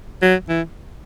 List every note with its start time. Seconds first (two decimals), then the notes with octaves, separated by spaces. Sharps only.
0.22 F#3
0.49 E3